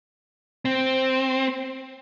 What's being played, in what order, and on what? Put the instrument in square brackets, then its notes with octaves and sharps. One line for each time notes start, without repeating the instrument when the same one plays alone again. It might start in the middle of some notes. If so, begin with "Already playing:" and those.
[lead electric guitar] C4